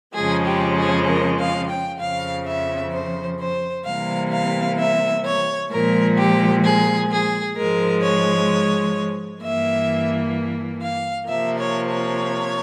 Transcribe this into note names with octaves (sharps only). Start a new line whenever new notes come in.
F2 C#3 F3 G#3 G#4
G4
G#4
A#4
F5
G5
F2 C#3 F3 F5
E5
C5
C5
C3 E3 G3 A#3 F5
F5
E5
C#5
A#2 F3 G#3 A#4
G4
G#4
G#4
G#2 F3 G#3 A#4
C#5
G2 E3 A#3 E5
F5
C3 F3 A#3 E5
C#5
C#5